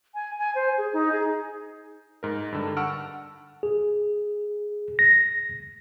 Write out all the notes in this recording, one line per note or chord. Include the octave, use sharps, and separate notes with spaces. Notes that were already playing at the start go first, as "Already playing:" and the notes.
G#5
G#5
C5
G#4
D#4
G#4
G#2 A#4
G2 D3
F#5 A5 C#6 E6 F6 D7
G#4
A#6